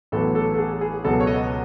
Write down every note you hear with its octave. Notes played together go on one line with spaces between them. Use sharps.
A1 A2 F#3 B3 A4
A4
A4
G#4
G#4
C#2 B2 F#3 B3 A4
C#5
D#5